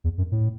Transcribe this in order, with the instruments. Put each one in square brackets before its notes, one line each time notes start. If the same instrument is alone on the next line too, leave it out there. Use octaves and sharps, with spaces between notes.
[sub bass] E2
F#2
A2